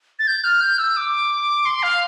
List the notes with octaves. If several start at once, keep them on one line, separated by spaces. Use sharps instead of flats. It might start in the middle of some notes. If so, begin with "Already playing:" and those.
A6
G6
F6
G6
E6
D6
C6
F5